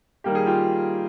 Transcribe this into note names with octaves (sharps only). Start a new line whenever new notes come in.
D#3 G3 A#3 G4
G#4
F4 G4